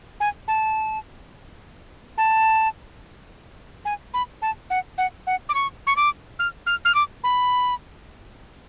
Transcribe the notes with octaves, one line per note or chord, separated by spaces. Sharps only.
G#5
A5
A5
G#5
B5
A5
F#5
F#5
F#5
D6
C#6
C#6
D6
F6
F6
F6
D6
B5